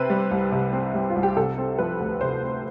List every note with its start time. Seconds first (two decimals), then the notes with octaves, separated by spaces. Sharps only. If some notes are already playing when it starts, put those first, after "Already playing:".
Already playing: C3 C4 B4
0.10 G3
0.31 C2
0.52 C3
0.73 C4
0.94 G3
1.10 F4
1.16 C2
1.23 G4
1.37 C3 A4
1.58 C4
1.79 F3 B4
2.00 D2
2.21 C3 C5
2.43 C4